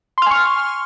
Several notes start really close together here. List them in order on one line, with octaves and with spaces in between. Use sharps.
C6 F6 G#5 C#6